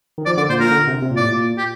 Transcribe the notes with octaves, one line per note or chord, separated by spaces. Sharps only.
D#3
F3 D5
D3 D5
A#2 C5
A#2 A#4
D3
C3
C3
A#2
A2 D5
A#2
G4